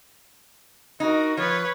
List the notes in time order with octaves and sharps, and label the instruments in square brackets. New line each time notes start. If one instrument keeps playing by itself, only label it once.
[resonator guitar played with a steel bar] D#4 [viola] F#4 A#4
[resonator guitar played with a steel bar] F3 [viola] B4 C#5